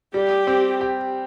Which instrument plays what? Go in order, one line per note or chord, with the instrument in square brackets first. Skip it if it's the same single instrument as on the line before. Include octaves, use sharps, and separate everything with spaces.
[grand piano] G3 [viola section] G4
[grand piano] C4
G4